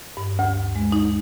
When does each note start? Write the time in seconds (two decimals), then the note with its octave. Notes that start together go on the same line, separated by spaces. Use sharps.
0.17 G2
0.39 D2
0.76 G#3
0.92 D#4